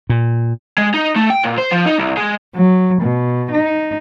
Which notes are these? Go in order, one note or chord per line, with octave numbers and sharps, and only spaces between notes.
A#2
G#3
D#4
A3
G5
A#2
C5
F3
D#4
C2
G#3
F#3
B2
D#4